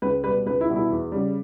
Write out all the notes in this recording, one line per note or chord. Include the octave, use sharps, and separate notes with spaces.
C#2 B4
B2 G3 B4
C#2 B4
E4
B2 G3
E4
E2
C#3 G3